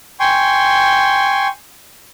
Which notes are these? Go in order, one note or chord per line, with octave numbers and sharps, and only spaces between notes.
G5 G#5 C6 C#6